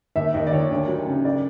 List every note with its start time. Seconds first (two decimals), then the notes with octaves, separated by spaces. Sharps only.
0.16 D#2 E5
0.34 D#2 D#5
0.47 D5
0.52 D#2 C#5
0.71 D2
0.88 F#3
1.07 C#3
1.25 D5